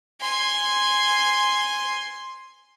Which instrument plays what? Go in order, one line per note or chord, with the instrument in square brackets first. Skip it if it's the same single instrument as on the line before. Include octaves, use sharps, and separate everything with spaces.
[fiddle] G#5 C6